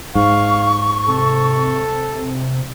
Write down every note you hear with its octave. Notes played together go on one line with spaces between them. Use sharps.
G#2 F5 C#6
C3 A4